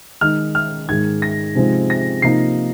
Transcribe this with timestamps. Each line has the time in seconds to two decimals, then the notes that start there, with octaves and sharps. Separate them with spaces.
0.21 D#3 G#3 D#4 F6
0.55 F6
0.89 G#2 D#3 G#3 G#6
1.22 A#6
1.55 C3 F3 G#3 C4 D#4
1.90 A#6
2.22 C3 F3 A#3 D#4 C7